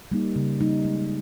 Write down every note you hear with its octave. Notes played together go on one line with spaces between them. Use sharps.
G3 A#3 D#4
C#3
G3 A#3 D#4
G#3